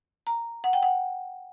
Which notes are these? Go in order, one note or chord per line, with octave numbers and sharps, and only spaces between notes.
A#5
F#5
G5
F#5